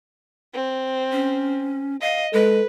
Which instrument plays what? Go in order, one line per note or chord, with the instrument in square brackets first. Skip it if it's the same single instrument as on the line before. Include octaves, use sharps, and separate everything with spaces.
[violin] C4
[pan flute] C#4
[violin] D#5 [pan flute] F5
[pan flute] G#3 [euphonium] A4 [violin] B4